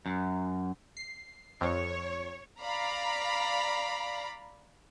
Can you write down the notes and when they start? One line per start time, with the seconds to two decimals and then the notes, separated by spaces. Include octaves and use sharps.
0.06 F#2
0.97 C7
1.61 F2 C#5
2.61 D5 F5 A#5 B5